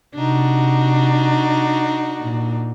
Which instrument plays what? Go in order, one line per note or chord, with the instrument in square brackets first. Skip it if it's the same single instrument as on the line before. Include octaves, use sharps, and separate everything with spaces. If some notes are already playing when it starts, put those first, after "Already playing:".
[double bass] C3 [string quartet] D4 D#4 F#4
[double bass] A#2